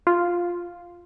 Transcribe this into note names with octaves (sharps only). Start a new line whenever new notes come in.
F4